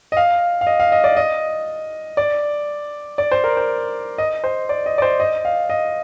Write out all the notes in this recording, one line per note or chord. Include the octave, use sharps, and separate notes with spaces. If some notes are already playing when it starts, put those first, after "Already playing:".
D#5
F5
F5
D#5
F5
D#5
D5
D#5
D5
D5
C5
A#4
C5
D#5
C5
D5
D#5
D5
C5
D#5
F5
D#5